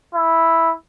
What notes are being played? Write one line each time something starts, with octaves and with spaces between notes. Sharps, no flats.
E4